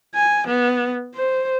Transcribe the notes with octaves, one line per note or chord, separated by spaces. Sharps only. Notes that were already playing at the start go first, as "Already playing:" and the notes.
G#5
B3
C5